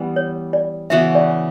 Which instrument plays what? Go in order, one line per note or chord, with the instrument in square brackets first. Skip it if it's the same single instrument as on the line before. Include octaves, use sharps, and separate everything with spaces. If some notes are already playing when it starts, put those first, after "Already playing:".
Already playing: [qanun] E3 G3 B3
[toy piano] C#5
D5
[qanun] C#3 E3 B3 F#4 [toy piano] E5
[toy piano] D5